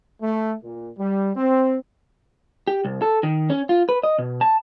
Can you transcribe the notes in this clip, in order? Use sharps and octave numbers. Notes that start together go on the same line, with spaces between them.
A3
A#2
G3
C4
G4
C2
A4
D#3
C#4
F4
B4
D#5
B2
A5